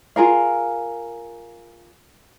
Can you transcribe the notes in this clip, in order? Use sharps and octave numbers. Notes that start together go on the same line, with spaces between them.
F4 G#4 A#4 F5